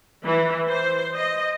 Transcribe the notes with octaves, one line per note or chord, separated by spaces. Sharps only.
E3
C5
D#5